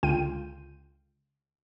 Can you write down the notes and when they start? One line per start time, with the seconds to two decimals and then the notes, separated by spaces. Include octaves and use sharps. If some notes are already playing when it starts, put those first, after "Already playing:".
0.03 C#2 D3 F4 G5 D#7